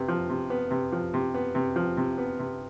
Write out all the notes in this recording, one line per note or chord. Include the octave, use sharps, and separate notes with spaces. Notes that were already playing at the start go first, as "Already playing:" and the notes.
Already playing: C3 B3
F3
C3
B3
C3
F3
C3
B3
C3
F3
C3
B3
C3